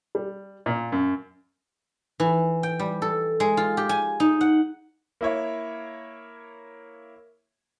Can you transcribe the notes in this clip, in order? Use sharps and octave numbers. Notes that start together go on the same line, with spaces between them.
G3
A#2
F#2
E3
G5
G3
A4
G#3
F4
G4
G#5
D#4
F#5
A#3 E4 C#5